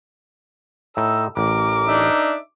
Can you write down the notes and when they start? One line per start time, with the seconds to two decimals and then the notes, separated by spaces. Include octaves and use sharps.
0.97 A2 D#4 E6
1.37 A1 A#4 D6
1.88 D4 D#4 E5